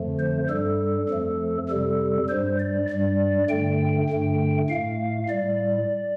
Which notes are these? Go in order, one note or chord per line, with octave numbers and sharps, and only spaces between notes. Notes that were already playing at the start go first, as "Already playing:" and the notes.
Already playing: F2 D3 F3 A3
C5
G2 G3 A4
F2 F3 A3
F2 C3 G3 A4
G2 G3 C5
D5
G2 G3 D5
G2 D3 A3 G5
G2 D3 A3
A2 A3 F5
A2 G3 D5